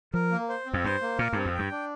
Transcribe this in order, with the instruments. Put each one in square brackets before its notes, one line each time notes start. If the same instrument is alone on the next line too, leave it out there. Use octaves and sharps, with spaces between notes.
[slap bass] F3 [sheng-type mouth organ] A#4
[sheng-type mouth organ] A#3
C5
C4
[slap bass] F2
[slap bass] G2 [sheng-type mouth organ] C5
[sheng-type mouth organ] A#3
[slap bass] A#2 [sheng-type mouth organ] A#4
[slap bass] G2 [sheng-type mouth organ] C4
[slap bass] F2
[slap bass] G2 [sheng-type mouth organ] G5
[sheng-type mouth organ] D4